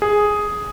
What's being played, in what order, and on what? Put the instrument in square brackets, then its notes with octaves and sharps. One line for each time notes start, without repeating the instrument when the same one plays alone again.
[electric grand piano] G#4